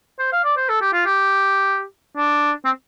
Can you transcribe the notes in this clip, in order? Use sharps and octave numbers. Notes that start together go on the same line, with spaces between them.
C5
F5
D5
C5
A4
G4
F4
G4
D4
C4